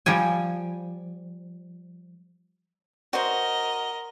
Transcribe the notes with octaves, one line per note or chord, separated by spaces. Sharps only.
F3 G3 G5 G#5
F#4 A#4 C5 D#5